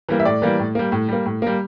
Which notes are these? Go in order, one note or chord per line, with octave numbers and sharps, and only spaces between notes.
E3 G3 A#3
E5
A2 D5
E3 G3 A#3
A2
G3 A#3
A2
G3 A#3
A2
G3 A#3